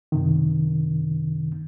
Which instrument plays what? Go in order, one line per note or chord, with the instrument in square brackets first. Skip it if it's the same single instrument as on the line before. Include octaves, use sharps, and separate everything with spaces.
[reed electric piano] F#2 C3 D#3